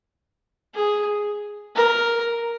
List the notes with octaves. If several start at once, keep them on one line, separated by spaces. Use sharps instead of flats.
G#4
A#4